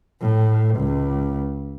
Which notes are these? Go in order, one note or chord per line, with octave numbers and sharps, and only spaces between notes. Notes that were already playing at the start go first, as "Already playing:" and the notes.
A2
C#2